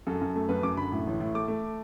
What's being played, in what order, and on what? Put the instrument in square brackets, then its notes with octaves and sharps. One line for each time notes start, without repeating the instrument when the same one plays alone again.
[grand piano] F#2 A4
F#2
A3
F#2 B4
F#2 D6
D3 B5
A2
A1
A2
A3 D6
A3